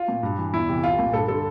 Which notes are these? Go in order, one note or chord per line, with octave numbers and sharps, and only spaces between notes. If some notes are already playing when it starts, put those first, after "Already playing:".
Already playing: F4
A#2
G2
E3
E2 E4
C3 E3
C2 F4
A#2
G2 A4
D3 A4